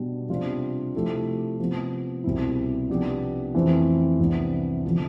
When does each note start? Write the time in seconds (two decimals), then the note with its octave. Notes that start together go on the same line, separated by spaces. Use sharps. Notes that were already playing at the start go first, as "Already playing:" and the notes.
Already playing: B2 G3 D4
0.29 C3 G3 D4 F4
0.94 C3 F3 A3 E4 G4
1.59 C3 F3 B3
2.24 C2 B2 G3 C4 E4
2.89 C3 F3 B3 D4 G4
3.55 F2 E3 A3 C4
4.19 C2 C3 E3 B3 D4
4.84 D3 F3 C4